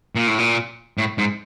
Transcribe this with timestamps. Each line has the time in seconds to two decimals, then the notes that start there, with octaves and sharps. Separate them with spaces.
0.15 A#2
0.28 A2
0.39 A#2
0.98 A2
1.18 G#2